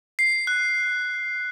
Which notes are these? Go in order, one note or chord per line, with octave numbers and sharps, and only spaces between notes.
C7
F#6